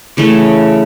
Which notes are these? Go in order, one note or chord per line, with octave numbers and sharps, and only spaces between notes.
C#3 E3 A3